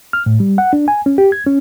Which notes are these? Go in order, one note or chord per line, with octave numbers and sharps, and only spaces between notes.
F6
A2
G3
F#5
D4
G#5
C#4
G4
G#6
C#4